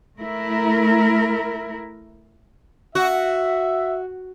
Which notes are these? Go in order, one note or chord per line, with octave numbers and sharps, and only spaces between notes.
A3 E4 A#4
F#4 E5